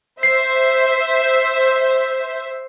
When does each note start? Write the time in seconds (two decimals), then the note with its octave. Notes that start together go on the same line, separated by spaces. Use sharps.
0.23 C5 E5 C7